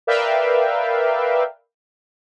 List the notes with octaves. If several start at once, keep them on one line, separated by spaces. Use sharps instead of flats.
A#4 B4 D5 E5 F5 G5